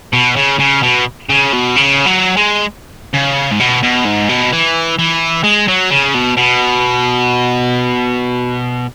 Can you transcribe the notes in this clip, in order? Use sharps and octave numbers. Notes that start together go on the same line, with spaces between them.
B2
C#3
C#3
B2
C#3
B2
C#3
F#3
G#3
C#3
G#2
B2
B2
G#2
B2
E3
E3
G#3
F#3
C#3
B2
B2